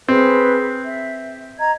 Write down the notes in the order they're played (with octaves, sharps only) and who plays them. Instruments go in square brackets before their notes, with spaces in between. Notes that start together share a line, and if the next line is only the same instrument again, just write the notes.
[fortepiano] C4 [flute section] G#4 B4
[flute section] E5
D#5 A#5 G#6